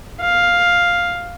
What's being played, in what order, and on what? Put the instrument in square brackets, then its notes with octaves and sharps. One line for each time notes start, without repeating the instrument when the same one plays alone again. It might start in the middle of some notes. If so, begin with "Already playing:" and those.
[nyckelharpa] F5